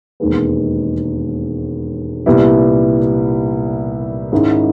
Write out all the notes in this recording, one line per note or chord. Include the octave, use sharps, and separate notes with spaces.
E1 D#2 D#3 G#3 B3
C2 A#2 G3 B3 E4
G#2 D#3 G#3 C#4 E4